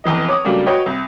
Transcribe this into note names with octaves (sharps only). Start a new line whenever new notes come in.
F1 E2 E3 D#5
C#5 D6 D#6
C#3 F#3 G3 A3 A#3 D4
F#4 B4 C#5 D#5 G5
C2